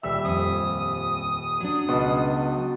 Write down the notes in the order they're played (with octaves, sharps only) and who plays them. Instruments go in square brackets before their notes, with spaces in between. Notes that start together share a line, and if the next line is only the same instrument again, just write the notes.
[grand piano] D#1 G3 E6 [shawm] E5
[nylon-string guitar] F2 [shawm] D#6
[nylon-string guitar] F#3 D4
[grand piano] C#2 [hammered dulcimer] B2 A5